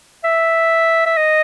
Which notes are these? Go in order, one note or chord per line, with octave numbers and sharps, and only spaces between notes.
E5
E5
D#5